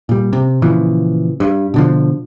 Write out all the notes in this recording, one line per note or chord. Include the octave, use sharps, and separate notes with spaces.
A#2 G3
C3
A#2 C#3 E3 F3
G2
B2 D3 F3